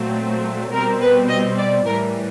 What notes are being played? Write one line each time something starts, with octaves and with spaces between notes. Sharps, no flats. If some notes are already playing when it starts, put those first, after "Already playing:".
Already playing: A#2 F#3 A3 C4
B2 G3 C4 A#4
B4
D#5
D5
A2 E3 G3 A#4